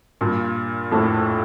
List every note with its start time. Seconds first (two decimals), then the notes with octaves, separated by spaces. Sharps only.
0.21 G2 A#2
0.92 F2 A2